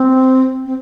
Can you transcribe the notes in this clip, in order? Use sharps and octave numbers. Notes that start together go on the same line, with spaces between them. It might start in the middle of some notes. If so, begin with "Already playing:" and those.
Already playing: C4
C4